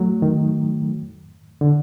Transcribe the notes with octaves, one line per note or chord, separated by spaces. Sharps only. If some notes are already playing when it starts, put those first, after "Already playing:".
Already playing: F#3 A3
D#3
D3